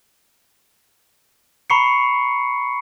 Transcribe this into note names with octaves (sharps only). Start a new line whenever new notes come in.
A#5 B5 C#6 C7 C#7